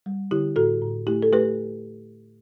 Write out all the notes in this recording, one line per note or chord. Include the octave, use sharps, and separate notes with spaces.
G3
D3 E4 G4
A2 F#4 A4
A2
A3 E4 G4
A4
A3 G4 B4